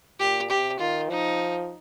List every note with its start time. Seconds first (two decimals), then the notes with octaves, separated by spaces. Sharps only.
0.19 A#2 G4
0.50 C3 G4
0.79 D#3 F4
1.09 F3 D#4